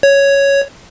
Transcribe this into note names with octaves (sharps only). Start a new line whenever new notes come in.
C#5